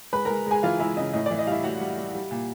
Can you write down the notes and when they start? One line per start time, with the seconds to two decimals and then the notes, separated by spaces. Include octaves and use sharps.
0.13 G#3 B4 B5
0.25 G#3 A#4 A#5
0.46 G#3 G#4 G#5
0.63 E3 F4 F5
0.80 G#3 E4 E5
0.97 C#3 D#5
1.13 A2 D#5
1.26 E3 D5
1.39 D#5
1.47 G3 E4 E5 F5
1.64 A2 F#4 F#5
1.81 G3
1.97 G3
2.14 G3
2.31 A#2